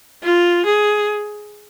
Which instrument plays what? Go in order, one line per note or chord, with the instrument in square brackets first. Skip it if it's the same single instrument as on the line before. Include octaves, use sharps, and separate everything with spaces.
[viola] F4
G#4